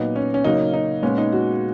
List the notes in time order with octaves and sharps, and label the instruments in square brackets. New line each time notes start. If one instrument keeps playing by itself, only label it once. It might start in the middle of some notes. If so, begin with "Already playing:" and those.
Already playing: [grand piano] A#2 F#3 B3 D#4
C#4
C#4
C#3 F#3 A#3 D#4
D#4
A#2 G#3 B3 C#4
D#4
F#4